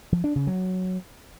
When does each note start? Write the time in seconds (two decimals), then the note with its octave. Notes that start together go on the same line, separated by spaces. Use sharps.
0.12 F3
0.24 D4
0.36 C#3
0.47 F#3